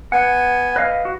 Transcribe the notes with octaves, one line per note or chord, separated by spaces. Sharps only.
B3 F#5 G#5
B4 D#5 F5
F#4